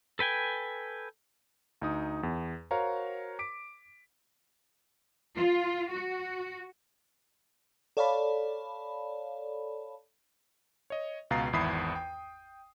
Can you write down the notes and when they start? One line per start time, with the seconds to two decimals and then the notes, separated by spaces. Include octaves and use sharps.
0.19 A4 B4 G5 G#5
1.81 D2 D#4 D#6
2.23 E2
2.71 F#4 A#4 C5 C#5 F5 A#5
3.39 D6 B6 D7
5.37 F4
5.91 F#4
7.97 A4 C#5 D5 F5 A5 B5
10.90 C#5 D#5
11.31 C#2 B2 F5 A#5 A6 C7
11.53 G#1 E2 E4 B5 D#6 C7
11.96 G5